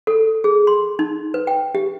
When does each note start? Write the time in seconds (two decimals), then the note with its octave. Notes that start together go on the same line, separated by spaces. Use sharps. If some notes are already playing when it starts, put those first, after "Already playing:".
0.07 A4
0.44 G#4
0.67 C6
0.99 D#4
1.34 B4
1.47 G5
1.75 G4